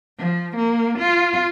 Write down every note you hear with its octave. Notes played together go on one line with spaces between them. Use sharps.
F3
A#3
F4